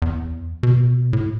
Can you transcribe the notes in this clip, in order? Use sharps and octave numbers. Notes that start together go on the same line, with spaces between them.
E2
B2
A2